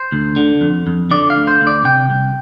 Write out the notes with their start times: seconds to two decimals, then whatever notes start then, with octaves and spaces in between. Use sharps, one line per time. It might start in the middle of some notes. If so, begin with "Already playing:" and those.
Already playing: C5
0.12 D2
0.36 D3
0.61 F2
0.87 F2
1.11 D3 D5
1.30 F5
1.36 D2
1.47 C5
1.61 D2
1.67 D5
1.85 C3 G5
2.10 C2